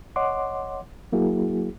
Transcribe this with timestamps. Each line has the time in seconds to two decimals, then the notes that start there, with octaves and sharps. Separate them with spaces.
0.16 C#5 D#5 F#5 C6 D6
1.12 F#3 A#3 E4 F#4 G#4